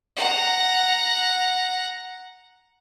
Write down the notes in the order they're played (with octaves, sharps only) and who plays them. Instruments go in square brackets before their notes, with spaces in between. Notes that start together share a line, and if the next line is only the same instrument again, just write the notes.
[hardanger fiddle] F#5 A#5